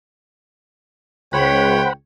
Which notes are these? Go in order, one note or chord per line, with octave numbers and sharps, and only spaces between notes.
C#2 C5 C#5 F#5 G5 B5